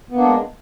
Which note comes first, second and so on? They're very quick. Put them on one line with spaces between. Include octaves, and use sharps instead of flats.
B3 A#3 D4 G#3